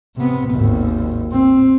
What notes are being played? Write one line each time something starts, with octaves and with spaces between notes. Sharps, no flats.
C3 B3
G#1 D#2
C4